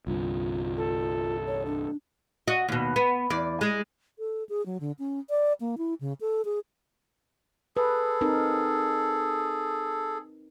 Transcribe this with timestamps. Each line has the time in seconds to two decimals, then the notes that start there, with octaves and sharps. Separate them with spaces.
0.07 C2 G2 D3 F4
0.77 A4
1.47 C#5
1.66 D4
2.48 F#4 D#5
2.68 D#2 B2
2.96 B3
3.30 E2 D5
3.61 G#3 G#4
4.19 A4
4.49 G#4
4.66 F#3
4.80 D3
4.99 C#4
5.30 D5
5.60 A#3
5.78 E4
6.01 C#3
6.21 A4
6.45 G#4
7.77 G#4 A4 B4
8.21 C4 D#4 A#4